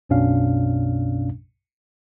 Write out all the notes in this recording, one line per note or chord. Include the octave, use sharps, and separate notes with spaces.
B1 F#2 B2 C#4 D4 F5